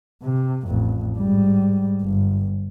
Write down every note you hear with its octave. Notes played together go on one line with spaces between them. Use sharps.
C3
A1 F2
G#2 G3
G1